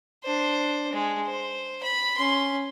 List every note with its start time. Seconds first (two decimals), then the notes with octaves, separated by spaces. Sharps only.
0.23 D4 C5
0.93 G#3
1.25 C5
1.83 B5
2.17 C#4 C6